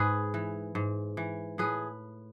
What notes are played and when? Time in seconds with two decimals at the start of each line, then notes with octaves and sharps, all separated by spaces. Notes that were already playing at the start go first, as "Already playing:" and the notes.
Already playing: G#2 G#4 B4
0.34 E3
0.75 G#2
1.17 E3
1.58 A2 G#4 B4